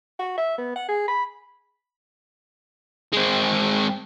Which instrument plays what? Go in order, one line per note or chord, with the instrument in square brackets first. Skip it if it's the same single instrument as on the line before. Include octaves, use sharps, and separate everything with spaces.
[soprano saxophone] F#4
E5
B3
F#5
G#4
B5
[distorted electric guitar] G#3 C4